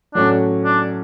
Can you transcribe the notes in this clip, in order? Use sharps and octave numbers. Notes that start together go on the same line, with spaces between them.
A2 F#3 C#4 D4 F#4
D4